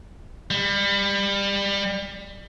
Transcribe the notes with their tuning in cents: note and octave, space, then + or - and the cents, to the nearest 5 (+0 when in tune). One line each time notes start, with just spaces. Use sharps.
G3 +25